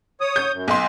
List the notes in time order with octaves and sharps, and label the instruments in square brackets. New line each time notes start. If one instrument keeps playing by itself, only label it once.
[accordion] C#5 D#6
[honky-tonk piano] G6
[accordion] F#2
[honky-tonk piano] B1 C6